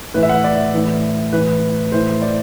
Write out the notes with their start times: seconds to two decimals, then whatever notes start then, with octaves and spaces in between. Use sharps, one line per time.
0.14 A2 E3 B4
0.23 E5
0.29 F#5
0.44 D5
0.74 A2 E3
1.33 A2 E3 B4
1.92 A2 E3 C5
2.22 D5